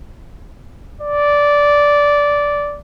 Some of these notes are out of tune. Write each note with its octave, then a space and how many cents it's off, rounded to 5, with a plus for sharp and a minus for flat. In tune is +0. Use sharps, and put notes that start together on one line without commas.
D5 -10